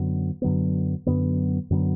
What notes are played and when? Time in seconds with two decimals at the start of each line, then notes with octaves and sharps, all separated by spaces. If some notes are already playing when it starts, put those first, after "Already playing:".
Already playing: F#2 D3 F#3 B3
0.42 F#2 D3 F#3 B3
1.06 F#2 D3 F#3 B3
1.70 F#2 D3 F#3 B3